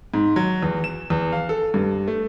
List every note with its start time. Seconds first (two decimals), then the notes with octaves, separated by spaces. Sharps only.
0.14 G#2
0.36 F#3
0.63 E2
0.84 E7
1.10 E2
1.32 F5
1.49 A4
1.74 G2
2.08 A3